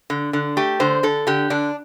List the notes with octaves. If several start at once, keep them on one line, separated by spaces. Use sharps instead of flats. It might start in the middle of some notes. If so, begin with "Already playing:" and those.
D3
D3
A3 G4
D3 C5
D3 A4
D3 G4
D3 D4